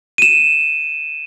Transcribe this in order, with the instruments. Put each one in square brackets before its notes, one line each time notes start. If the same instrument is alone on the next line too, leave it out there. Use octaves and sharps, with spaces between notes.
[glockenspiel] D#7 E7